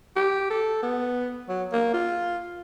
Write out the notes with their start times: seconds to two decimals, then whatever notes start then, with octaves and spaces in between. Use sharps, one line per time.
0.16 G4
0.50 A4
0.83 B3
1.49 F#3
1.73 A#3
1.94 F4